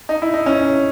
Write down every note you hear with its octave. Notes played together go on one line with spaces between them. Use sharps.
D#4
E4
D#4
C#4